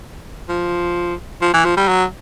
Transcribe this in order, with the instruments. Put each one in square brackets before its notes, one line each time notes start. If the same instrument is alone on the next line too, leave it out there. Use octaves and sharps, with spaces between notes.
[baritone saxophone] F3
F3
E3
F3
G3
F#3